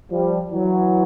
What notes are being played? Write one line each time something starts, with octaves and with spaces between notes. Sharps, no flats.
F3 G3
E3 F#3